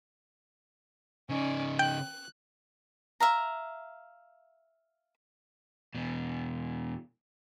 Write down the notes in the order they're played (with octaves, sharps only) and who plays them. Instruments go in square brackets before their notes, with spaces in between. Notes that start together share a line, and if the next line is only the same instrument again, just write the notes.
[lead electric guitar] C#3 D#4 [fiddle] C#4 D5
[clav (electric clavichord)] G5 [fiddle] F#6
[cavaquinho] E5 F5 A#5
[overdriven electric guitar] E2 B2